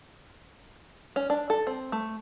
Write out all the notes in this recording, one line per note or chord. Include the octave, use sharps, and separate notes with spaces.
C#4
D4
A4
C4
A3